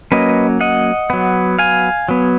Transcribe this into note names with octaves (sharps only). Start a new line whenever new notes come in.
F#3 A#3 C#4 B4 D#5
D#5 F#5
F#3 B3
F5 G#5
F#3 B3